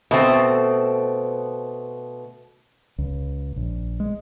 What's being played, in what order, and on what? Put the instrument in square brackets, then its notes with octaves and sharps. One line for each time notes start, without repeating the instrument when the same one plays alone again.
[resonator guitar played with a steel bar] B2 A3 C4
[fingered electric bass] C#2
A#1
G#3